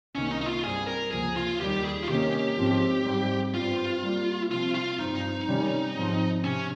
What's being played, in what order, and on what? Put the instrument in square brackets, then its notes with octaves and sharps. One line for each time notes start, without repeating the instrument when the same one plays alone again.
[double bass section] C2 C3 D#3 A#3 [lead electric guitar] C#4
[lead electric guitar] D#4
D#4
F4
[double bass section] G2 G3 C4 [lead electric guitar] G#4
[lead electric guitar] A#4
[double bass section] C#2 C3 F3 A#3 [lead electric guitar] G#4
[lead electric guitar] F4
[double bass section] D#2 D#3 G3 [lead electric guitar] G4
[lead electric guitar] G#4
F4
[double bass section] C3 D#3 A#3 C#4 [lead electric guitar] G4
[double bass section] G#2 F3 C4
G#2 G3 C4
[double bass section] G2 G3 C4 [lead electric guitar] F4
[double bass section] C3 G3 A#3
[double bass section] C3 F3 C4 [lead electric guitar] F4
[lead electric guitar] F4
[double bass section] G2 F3 C4 [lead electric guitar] D#4
[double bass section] C3 D#3 G3 C#4
G#2 F3 C4
[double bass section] C3 [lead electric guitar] C#4